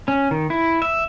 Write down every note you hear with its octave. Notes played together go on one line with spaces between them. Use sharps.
C#4
D#3
E4
E5